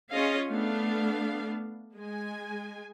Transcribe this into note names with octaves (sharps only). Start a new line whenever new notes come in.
C#4 F4 G#4 C#5 D#5 F5
A3 B3 D4 F5
G#3 G#5